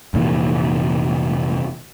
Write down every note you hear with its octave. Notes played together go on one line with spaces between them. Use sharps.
F1 A#2 E3